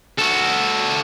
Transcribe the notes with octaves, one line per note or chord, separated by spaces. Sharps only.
F#4 A4